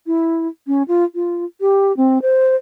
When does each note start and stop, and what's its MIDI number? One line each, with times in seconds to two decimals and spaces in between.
0.07 0.47 64
0.67 0.83 61
0.88 1.04 65
1.15 1.45 65
1.61 1.95 67
1.97 2.21 60
2.22 2.55 72